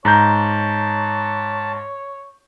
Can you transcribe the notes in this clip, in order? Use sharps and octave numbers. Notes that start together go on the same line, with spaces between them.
G#2 C#5 A5 A#5 G6